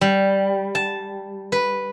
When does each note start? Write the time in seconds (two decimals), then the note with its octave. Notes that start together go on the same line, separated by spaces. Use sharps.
0.01 G3
0.75 A5
1.52 B4